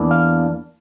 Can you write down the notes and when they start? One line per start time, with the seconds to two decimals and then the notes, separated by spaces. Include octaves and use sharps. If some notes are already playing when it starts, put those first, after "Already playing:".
Already playing: E2 E3 A#3 D4
0.11 F5